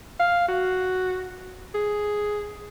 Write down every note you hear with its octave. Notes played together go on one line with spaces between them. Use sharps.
F5
F#4
G#4